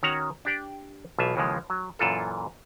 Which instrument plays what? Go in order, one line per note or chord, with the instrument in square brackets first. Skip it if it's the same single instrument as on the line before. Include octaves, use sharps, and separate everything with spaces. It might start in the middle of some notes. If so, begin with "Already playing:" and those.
[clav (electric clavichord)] D#3 C#4 F#4 C#5 F#5 A#5
D4 G4 D5 G5
B1 B2 E3 F4 E5
D#2 C#3 E3 F3 G#3
F#3
F#2 A#2 E3 F4 A4